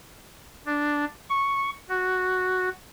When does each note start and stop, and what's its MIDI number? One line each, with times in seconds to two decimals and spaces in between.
0.66 1.05 62
1.30 1.70 85
1.89 2.69 66